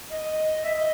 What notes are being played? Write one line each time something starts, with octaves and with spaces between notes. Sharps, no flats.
D#5
E5
D#5